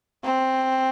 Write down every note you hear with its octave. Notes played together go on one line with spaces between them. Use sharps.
C4